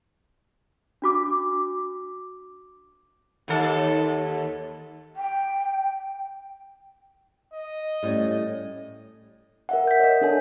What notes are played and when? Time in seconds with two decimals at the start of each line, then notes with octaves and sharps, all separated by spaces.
1.02 D4 F#4 D6
3.48 D#2 A4
5.16 G5
7.53 D#5
8.03 A2 G3 C#4
9.69 A#4 E5 F#5
9.87 G6 B6
10.00 C#5 D#5
10.21 D4 A4 G#5